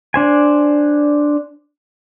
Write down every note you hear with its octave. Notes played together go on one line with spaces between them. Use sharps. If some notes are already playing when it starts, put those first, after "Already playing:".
D4 C5 G#5